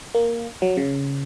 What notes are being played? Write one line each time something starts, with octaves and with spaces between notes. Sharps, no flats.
A#3
F#3
C#3